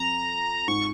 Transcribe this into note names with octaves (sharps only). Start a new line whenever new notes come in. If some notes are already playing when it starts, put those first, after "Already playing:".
Already playing: F2 A#5
G#2 C#6